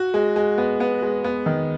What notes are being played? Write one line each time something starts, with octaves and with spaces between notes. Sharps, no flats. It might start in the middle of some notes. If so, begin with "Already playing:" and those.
Already playing: F#4
G#3
G#3
B3
B3
G#3
B3
D#3